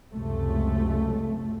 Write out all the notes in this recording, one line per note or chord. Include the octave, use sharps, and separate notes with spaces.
C#2 F#2 C3 A3